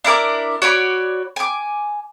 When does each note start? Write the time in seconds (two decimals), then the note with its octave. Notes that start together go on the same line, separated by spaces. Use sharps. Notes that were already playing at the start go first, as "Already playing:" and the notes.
0.04 D4 E4 A#4 D6
0.62 F#4 C#5 D5 B5
1.36 G#5 D6